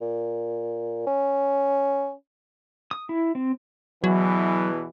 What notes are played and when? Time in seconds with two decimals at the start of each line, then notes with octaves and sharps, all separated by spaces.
0.01 A#2
1.07 C#4
2.91 D#6
3.09 E4
3.35 C4
4.04 E2 B2 E3 F#3